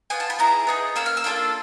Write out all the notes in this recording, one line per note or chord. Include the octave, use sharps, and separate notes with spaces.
B3 D4 F4 G#5
A5
B5
B3 E4 G#4 A#5
B3 D#4 G#4
A#3 C#4 E6
F6
E6
A#3 D4 F4 A4